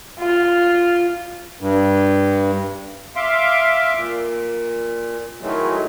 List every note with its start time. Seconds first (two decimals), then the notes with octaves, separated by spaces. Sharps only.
0.19 F4
1.61 G2
3.16 E5 F5 C6 D6
3.95 A#2
5.41 D#3 E3 F#3 G#3 A3